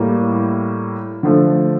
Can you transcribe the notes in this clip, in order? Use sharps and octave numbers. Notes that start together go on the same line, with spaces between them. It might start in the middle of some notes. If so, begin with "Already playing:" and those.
Already playing: A2 G3 A#3
D3 F3 A3